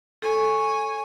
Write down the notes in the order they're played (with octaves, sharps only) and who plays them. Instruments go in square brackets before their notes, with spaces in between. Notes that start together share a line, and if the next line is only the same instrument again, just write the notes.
[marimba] A4 [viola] C#5 G#5